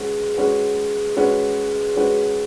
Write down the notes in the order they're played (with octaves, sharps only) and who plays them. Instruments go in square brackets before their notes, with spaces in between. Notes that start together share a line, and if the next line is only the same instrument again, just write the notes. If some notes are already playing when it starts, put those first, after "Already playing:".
Already playing: [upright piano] G#3 C#4 F#4 B4
G#3 C#4 F#4 B4
G#3 C#4 F#4 B4
G#3 C#4 F#4 B4